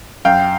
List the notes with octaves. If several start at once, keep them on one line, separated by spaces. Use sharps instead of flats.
F#2 F5 G5